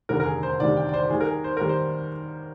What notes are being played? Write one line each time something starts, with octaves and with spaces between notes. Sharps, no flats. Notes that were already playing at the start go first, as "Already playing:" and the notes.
F1 D#2 D3 G3 A#4
A#4
G#4
C5
F1 D#2 D3 G3 D5
G5
D5
C5
G4
D#2 D#3 G3 G#4
A#4
G#4
C5
D#2 D#3 G3 A#4
C5